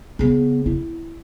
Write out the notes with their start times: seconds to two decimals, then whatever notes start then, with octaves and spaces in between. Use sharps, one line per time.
0.19 C#3 B3
0.66 E4